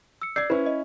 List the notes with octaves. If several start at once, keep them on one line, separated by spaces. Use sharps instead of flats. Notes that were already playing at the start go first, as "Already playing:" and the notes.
E6 C#7
D5 E6 G6 G#6 C7
C#4 E4 B4 C5
D#5